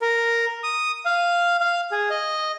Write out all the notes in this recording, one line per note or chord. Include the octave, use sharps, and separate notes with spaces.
A#4
D#6
F5
F5
G#4
D#5